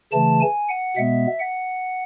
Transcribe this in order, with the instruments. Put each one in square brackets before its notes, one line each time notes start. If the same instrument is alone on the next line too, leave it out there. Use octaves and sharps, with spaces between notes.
[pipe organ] C#3 E3 A3 A5
G#5
F#5
B2 G#3 B3 E5
F#5